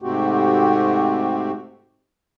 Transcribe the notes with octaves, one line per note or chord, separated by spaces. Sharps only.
G#2 C3 A3 C4 F#4 G4